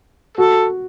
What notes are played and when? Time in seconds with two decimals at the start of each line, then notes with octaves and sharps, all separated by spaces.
0.37 F#4 A4